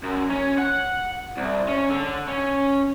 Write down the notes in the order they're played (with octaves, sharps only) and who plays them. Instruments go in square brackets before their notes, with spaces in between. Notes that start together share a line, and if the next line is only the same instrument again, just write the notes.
[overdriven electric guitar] F#2
C#4
F#5
C2
C#4
D3
C#4